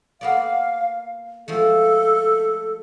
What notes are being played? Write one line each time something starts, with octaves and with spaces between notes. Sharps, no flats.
A#3 B3 D5 F5
F3 G#3 A3 A4